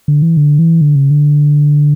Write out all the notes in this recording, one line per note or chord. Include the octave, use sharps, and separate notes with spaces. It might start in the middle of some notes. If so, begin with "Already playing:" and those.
D3
E3
D3
E3
D3
C#3
D3